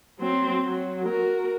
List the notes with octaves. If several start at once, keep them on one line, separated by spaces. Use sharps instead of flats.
F#3 C4
F#3
F#4 A#4